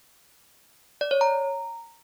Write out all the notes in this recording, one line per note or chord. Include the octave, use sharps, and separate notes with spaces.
D5
C#5
A#5